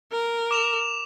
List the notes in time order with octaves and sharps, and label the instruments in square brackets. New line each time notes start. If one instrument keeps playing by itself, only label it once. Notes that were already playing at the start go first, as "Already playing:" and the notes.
[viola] A#4
[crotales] D6 E7 F7